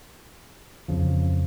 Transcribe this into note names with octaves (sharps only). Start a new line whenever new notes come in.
F2 C#3 F3